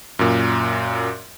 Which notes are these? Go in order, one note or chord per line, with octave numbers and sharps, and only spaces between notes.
F#2 A#2